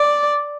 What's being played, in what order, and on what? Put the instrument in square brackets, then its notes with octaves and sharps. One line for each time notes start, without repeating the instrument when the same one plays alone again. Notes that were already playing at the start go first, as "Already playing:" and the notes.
Already playing: [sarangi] D5